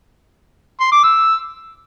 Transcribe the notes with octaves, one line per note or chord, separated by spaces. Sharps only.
C6
D6
E6